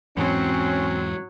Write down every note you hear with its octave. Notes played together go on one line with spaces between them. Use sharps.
E2 G#2 E3 F#3 C4 C#4